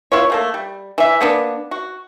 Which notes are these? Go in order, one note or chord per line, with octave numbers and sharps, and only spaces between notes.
B3 E4 F4 C#5
A3 A#3 A4
G3
E3 E5
A#3 B3 D4
F#4